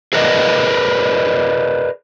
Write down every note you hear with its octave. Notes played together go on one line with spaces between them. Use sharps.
G#4 A#4 B4 D5 D#5